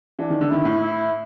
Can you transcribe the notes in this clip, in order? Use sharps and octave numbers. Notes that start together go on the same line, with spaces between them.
E3 D4
D#3
D3
D#3 E4
A2
E4